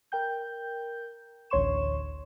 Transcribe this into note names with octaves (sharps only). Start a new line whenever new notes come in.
A#4 G5 G6
A1 D2 C#5 C6 C#6 E7